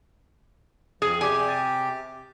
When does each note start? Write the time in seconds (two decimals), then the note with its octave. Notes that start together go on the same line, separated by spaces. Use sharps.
1.02 F2 F3 G#4
1.21 C3 G4 G#4 D5 G#5 D6
1.48 A6